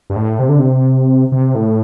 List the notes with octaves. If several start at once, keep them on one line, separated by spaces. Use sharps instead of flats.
G2
A2
C3
D3
C3
C3
A2